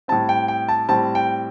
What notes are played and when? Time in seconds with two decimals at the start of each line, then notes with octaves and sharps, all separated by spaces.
0.08 A2 G3 C4 A5
0.29 G5
0.48 G5
0.68 A5
0.89 A2 G3 C4 A5
1.15 G5